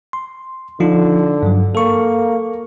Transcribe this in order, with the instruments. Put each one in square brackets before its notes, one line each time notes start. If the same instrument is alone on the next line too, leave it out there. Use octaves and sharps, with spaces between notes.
[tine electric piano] C6
[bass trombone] D3 [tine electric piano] F3 D#4 F4
[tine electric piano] G2 F#3
[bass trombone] A#3 [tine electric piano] A4 C#6